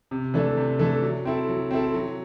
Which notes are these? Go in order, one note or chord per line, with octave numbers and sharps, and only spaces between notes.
C3
E3 A3 D4 A4
C3
E3 A3 D4 A4
F#3
C4 E4 A4
F#3
C4 E4 A4
F#3